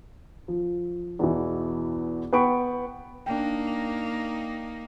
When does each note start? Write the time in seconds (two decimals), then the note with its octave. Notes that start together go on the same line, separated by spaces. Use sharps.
0.48 F3
1.19 E2 B2 E3
2.33 B3 B4 G5 B5 C#6 D7
3.26 A#3 D4 D#4 G5